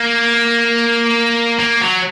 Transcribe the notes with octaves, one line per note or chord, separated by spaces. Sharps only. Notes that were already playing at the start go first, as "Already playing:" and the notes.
Already playing: A#3
A#3
F#3